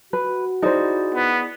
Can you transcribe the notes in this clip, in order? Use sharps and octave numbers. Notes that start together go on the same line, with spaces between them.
F#4 B4
D#4 E4 G#4 C5 D5
B3